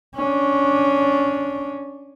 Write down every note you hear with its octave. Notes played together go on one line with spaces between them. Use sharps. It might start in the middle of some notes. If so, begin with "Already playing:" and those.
C#4 D4